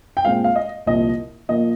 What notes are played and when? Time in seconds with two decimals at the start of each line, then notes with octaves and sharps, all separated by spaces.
0.17 G5
0.25 A#2 G#3 C4 F5
0.44 F5
0.56 D#5
0.86 C2 A#2 F3 A#3 D#5
1.49 A#2 F3 A#3 D#5